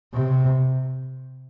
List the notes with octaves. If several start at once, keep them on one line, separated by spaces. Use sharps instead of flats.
C3